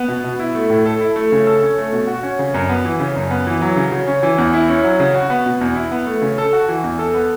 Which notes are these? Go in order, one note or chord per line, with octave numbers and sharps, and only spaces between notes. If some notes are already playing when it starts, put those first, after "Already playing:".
Already playing: B3
B2
B2
E4
A3
A2
A4
E4
A3
C#3
A4
C#4
A3
B2
F#4
C#4
C#3
F#2
B3
E3
C#3
F#2
B3
E3
F#3
C#3
C#3
C#4
E3
E2
E4
C#4
F#3
C#3
F#4
B3
B2
E2
E4
B3
A3
C#3
A4
F#4
E3
E2
A4
B3